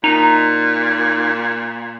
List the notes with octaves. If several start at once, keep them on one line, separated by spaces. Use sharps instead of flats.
A#2 D#4